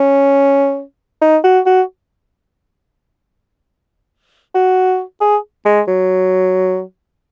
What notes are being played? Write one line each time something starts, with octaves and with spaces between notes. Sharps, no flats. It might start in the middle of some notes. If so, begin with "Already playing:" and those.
Already playing: C#4
D#4
F#4
F#4
F#4
G#4
G#3
F#3